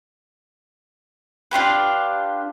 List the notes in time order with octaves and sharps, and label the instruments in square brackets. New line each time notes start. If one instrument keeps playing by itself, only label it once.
[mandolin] D4 F4 G4 B4